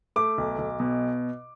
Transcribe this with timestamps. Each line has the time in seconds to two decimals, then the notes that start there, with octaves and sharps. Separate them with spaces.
0.16 A3 D6
0.38 B1
0.58 B1
0.80 B2